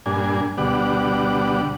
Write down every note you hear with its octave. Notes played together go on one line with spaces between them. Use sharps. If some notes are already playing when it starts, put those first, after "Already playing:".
G2 A#2 D4 G#5
D2 B2 G3 D5 F#5